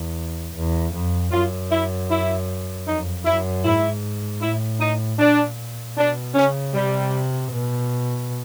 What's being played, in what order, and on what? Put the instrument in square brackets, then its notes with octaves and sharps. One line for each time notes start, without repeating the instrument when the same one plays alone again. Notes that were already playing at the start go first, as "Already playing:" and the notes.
Already playing: [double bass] E2
E2
F2
[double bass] F#2 [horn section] F4
[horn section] E4
E4
[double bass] F2 [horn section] D#4
[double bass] F#2 [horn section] E4
[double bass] G#2 [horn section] E4
[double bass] A2 [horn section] E4
[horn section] D#4
[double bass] A#2 [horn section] D4
[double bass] B2 [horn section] D4
[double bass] C#3 [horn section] C#4
[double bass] C3 [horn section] G3
[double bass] B2